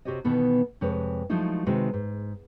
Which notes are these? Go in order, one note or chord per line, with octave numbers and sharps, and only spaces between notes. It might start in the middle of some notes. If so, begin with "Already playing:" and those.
C3 F#4 G4 C#5 D#5
B2 D#3 E3 B3 A4
F2 C3 G#3 B4 C#5
F3 F#3 G#3 A3 D#4 E4
C3 D#3 G#3 D#4 F#4 B4
G#2